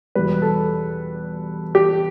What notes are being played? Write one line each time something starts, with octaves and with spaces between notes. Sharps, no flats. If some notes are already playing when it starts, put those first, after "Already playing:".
E2 B2 G3 B4
A4
G4